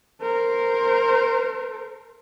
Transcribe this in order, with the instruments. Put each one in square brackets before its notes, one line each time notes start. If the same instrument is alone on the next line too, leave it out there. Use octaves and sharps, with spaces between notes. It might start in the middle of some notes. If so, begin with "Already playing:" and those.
[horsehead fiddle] A#4 C5